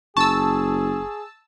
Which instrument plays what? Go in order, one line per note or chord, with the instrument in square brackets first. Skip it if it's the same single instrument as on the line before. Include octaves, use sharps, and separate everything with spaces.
[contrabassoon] F#1 [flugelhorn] G#4 [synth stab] A5 E6 [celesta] C#6